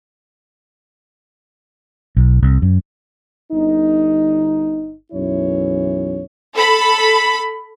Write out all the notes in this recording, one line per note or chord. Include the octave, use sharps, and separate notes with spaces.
B1
C2
F#2
G1 D#4
B1 F#2 E3 E4 C#5
A4 B5